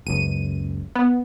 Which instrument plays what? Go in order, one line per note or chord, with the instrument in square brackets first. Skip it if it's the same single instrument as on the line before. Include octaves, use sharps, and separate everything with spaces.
[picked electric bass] F#1 C#2 [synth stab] D#7
[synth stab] B3